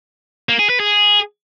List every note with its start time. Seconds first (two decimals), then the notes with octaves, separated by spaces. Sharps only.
0.49 A#3
0.59 G#4
0.70 B4
0.80 G#4